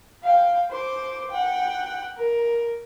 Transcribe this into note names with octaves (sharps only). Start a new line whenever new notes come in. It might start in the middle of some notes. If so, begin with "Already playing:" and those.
F5 G5
C5 D6
F#5 G5
A#4